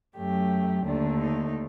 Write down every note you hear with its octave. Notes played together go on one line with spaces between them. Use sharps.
F#2 F#3 A3 G4
D#2 D3 A3 D4
D#4